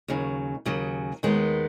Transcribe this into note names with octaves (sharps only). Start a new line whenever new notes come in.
D#2 C#3 F#3
D#2 C#3 F#3
D#2 D#3 G#3 B3